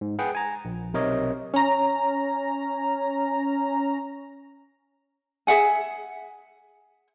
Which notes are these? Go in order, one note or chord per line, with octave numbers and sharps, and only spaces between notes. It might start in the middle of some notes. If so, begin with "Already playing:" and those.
G#2
G#4 B4 F#5 G5
G#5 A#5
A#1
B1 C3 A#4 C#5 D#5
C#4 A#5
G#4 E5 F#5 G#5